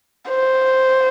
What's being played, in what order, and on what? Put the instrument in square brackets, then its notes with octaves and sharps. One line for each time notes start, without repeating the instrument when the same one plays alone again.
[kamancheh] C5